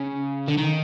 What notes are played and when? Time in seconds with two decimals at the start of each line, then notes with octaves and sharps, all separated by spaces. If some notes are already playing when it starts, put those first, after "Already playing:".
Already playing: C#3
0.48 D3
0.58 D#3